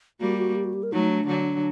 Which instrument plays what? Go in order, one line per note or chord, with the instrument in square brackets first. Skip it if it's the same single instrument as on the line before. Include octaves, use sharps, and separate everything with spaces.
[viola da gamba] G3 A#3 [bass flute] F#4
[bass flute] F#4
G4
F#4
G4
A#4
[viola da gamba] F#3 A3 [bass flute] D#4
[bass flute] D4
[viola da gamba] D3 F#3